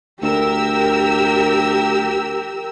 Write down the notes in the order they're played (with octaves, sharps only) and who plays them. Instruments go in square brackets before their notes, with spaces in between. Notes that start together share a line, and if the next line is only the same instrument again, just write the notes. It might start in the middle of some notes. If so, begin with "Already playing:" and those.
[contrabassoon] D2 [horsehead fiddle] G4 [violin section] A#4 E6